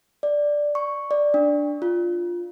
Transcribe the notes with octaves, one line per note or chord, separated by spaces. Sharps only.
D5
C#6
D5
D4
F4